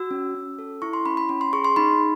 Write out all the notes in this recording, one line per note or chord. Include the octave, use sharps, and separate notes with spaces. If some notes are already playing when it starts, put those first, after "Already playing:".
Already playing: F#4 E6
C#4
C#4
A4
E4 C#6
C6
C#4 B5
B5
C#4 B5
C6
G#4 C#6
C6
D#4 B5